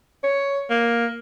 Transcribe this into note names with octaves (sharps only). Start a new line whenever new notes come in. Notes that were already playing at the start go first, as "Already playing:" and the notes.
C#5
A#3